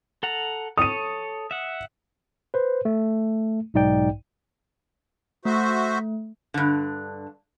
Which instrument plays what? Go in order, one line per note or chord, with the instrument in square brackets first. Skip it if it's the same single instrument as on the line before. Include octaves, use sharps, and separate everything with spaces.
[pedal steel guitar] A4 F#5 A#5
[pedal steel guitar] A4 C#5 [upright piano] D#6 D#7
[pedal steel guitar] E5 F#5
[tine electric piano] B4 C5
A3
B1 G#2 D#4 D5 G5
[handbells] A3 [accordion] F#4 C5 E5
[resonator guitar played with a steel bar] G2 D3